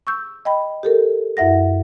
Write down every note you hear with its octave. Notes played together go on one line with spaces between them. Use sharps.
C#6 E6 G6
D#5 G5 B5
G4 A4 A#4
F#2 E4 E5 F#5 A#6